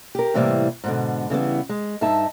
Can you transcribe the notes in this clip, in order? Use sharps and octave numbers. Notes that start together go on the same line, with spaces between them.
G4 A#4
A2 C3 E3 G3 A#3
G#2 B2 D3
C#3 E3 G3 B3
G#3
G2 D#4 E5 A5